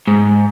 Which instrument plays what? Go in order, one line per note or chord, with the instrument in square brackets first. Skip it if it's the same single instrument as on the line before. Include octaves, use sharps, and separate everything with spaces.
[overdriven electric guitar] G#2